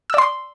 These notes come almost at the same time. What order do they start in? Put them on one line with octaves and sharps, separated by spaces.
E6 D5 C6